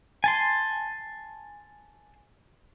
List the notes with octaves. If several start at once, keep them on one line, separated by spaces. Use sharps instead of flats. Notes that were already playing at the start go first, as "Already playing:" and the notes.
G#5 A5 C6